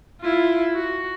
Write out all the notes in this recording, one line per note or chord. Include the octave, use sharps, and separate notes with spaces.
E4 F4
F#4